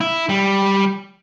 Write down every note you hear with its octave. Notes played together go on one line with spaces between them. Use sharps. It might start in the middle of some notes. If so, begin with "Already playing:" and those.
E4
G3